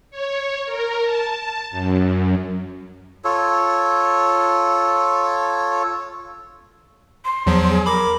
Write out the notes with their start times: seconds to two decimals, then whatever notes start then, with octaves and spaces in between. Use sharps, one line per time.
0.11 C#5
0.66 A#4
1.04 A5
1.71 F#2
3.25 F4 A4 C#5
7.25 C6
7.47 E2 F3 F#3
7.70 G#4
7.86 A#4 B5 D6